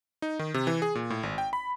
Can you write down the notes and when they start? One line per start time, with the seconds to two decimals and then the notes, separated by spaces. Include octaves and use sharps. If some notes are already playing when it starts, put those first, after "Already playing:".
0.22 D#4
0.39 D#3
0.54 C3
0.67 E3
0.82 G#4
0.95 A#2
1.10 A2
1.23 G#1
1.38 G5
1.53 B5